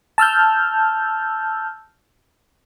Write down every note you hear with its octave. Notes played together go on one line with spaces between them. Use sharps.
A5 E6 F6 G6